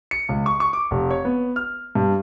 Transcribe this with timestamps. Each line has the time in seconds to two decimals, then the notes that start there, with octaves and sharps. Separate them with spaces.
0.11 C#7
0.29 C#2
0.46 C#6
0.60 C#6
0.73 D6
0.91 F1
1.11 C#5
1.25 B3
1.56 F6
1.95 G2